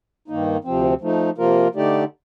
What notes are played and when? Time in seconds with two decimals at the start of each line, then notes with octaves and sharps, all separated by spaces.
0.28 G2 D#3 A#3 D#4
0.64 D2 C3 F3 C4
1.01 F3 A3 D#4
1.38 C3 F3 A#3 F4 A#4
1.75 D3 A3 D#4 G4 D5